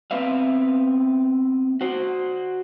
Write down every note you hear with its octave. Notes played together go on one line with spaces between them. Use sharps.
B3 C4 B4 E5 F5
F#4 C5